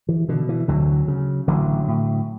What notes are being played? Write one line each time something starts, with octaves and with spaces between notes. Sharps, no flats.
E3
B2 D3
E3
D2 D3 F#3
C#3
A1 D3 F#3
A2